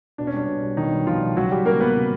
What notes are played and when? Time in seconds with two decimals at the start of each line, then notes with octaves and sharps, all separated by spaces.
0.18 B2 D4
0.27 C#4
0.34 G3 D4
0.48 B2
0.63 G3
0.77 B2 D#3 D#4
0.92 G3
1.07 B2 F3 F4
1.22 G3
1.36 C#3 F#3 F#4
1.51 F#3 G3 G4
1.65 C#3 A#3 A#4
1.80 F#3 B3 B4
1.96 C#3